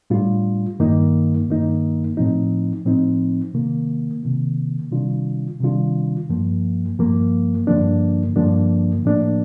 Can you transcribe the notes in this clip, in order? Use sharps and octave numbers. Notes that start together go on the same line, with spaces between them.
A2 G3 D4 F4
G2 D#3 A#3 D#4
G2 D#3 A#3 D#4
A2 F3 C4 D#4
A2 F3 C4 D#4
C3 D#3 A#3
C3 D#3 A#3
C3 D#3 G3 D4 F4
C3 D#3 G3 D4 F4
G2 F3 A#3
G2 F3 A#3
G2 D3 F3 A#3 D4
G2 D3 F3 A#3 D4
A2 F3 A#3 D4